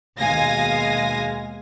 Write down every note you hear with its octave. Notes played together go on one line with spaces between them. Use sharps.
D#2 B2 G#3 F5 G#5 A#6